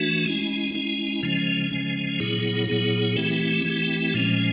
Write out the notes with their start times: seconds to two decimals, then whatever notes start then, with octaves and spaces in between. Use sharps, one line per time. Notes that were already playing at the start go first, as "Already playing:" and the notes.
Already playing: E3 A3 D4 F#4
0.25 G#3 C#4 E4
0.74 G#3 C#4 E4
1.23 C#3 F3 G#3 C#4
1.71 C#3 F3 G#3 C#4
2.20 A#2 F#3 B3 E4 G#4
2.68 A#2 F#3 B3 E4 G#4
3.16 E3 A3 C4 E4 G4
3.65 E3 A3 C4 E4 G4
4.14 A#2 F3 G#3 C#4